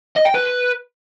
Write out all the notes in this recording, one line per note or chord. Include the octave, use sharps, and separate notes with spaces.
D#5
G5
B4